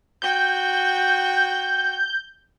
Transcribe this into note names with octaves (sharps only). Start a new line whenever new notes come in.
F#4 G5 G6